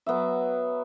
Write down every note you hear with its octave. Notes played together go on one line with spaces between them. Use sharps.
F#3 B3 F#4 E5